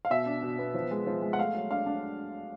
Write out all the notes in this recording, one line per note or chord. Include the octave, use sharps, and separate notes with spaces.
F5
B2 E5
D4
B2
B3
F3
G#3
F3
G#3
F#5
A3 F5
F#3
D4 F5
D4